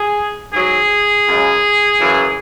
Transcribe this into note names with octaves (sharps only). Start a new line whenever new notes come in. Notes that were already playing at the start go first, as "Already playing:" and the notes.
Already playing: G#4
G#2 F#3 G#4
F#2 C#3 G#3
F#2 C#3 E3